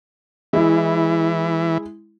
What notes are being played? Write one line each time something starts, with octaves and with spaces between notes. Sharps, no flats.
E3 G#3 E4